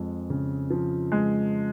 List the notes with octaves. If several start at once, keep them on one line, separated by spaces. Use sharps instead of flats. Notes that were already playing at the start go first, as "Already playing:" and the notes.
Already playing: F2 F3 G#3
C#3
F3
G#3